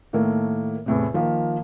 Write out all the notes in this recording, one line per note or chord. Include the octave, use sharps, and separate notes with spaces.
A2 D#3 A3 A#3
E2 A2 C3
D#3 F3 A#3